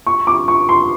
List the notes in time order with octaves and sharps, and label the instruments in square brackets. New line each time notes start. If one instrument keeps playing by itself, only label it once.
[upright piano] C#6
D6
C#6
C6